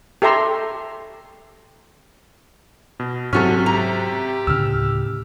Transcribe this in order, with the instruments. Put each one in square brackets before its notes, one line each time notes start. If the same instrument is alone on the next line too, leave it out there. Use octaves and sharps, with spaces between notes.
[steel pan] G4 A4 E5 A#5 C6
[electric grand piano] B2
[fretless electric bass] G#2 F#3 [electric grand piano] C3 F6 [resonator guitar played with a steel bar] C#4 F#4 A4
[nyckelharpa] G4 [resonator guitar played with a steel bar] A#5
[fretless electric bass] D2 A2 C#3 [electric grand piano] E6 F6